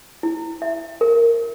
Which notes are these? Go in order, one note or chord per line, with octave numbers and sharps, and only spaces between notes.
E4
E5
A#4